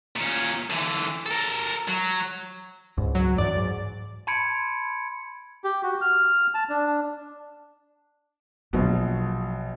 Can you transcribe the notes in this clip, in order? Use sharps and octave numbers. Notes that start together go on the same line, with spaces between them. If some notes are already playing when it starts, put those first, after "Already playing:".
A#2 C#4
D3 E3
A4 A#4
F#3
C#2 G#2
F#3
F#2 E3 F#3 D5
G#2
A5 B5 C6 G#6 C#7 D7
G4
F#4
F6
A5
D4
A#1 B2 F#3